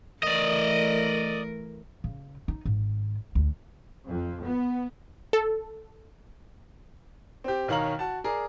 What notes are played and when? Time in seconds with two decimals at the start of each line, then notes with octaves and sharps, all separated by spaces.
0.23 E3 A3 A#4 D5 D#5
2.04 C#3
2.48 D#4
2.65 G#1
3.35 D2
4.08 F2
4.44 B3
5.33 A4
7.44 C4 G4
7.68 B1 D#3 C#5 F5 A#5 F#7
7.99 F#4 A5
8.24 G#4 A#4 D5